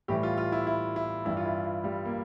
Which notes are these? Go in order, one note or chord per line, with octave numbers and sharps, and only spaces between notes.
A2 E3 G3 G4
F4
F4
E4
E4
E4
G2 E3 G3 E4
F4
E4
F4
G3
A#3